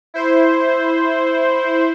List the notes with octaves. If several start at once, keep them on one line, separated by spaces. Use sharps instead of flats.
E4 C5